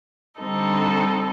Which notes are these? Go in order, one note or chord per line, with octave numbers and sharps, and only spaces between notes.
D3 G3 C4 D#4 A4